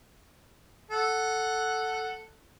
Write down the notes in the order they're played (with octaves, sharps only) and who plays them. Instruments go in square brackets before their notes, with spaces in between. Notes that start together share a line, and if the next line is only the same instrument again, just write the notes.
[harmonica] A4 F#5